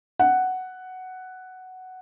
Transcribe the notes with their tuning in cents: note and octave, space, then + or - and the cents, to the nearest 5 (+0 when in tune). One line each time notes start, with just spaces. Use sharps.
F#5 +5